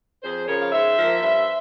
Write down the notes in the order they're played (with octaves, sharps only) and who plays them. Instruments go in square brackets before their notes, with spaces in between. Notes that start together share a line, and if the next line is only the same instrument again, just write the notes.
[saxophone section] F2 G#4 C5
C#3 F3 A#4 C#5
F5
G#2 C5 E5
F3 A#3
G2